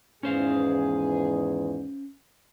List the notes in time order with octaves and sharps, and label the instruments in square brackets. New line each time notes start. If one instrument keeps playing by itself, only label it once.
[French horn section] E2 G#2 D#3 [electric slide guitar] C#4 C5 F5 [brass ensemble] G#4